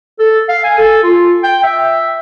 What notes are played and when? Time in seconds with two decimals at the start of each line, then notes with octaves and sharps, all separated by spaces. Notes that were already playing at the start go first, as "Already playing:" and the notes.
0.19 A4
0.49 F5
0.64 G#5
0.78 A4
1.03 F4
1.43 G5
1.63 E5